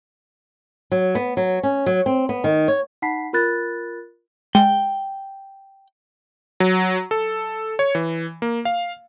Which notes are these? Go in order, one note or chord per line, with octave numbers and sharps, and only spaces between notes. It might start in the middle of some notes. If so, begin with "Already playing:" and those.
F#3
B3
F#3
C#4
F#3
C4
B3
D#3
C#5
D#4 F#5 A5 B5 B6 C7
F4 A#4 B5 F#6 A6
G#3 G5
F#3
A4
C#5
E3
A#3
F5